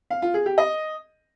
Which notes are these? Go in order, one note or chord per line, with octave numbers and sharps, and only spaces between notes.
F5
F4
G#4
G4
D#5